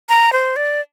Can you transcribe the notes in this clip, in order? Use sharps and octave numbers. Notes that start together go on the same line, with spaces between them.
A#5
C5
D5